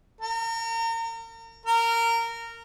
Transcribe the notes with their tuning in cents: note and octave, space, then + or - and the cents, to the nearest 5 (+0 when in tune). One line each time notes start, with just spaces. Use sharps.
A#4 -35
A#4 -15